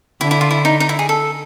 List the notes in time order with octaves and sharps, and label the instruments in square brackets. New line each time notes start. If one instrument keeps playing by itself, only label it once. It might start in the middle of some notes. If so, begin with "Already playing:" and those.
[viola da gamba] D3 [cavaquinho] E4
[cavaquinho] E4
F4
E4
D#4
D#4
E4
G#4
A4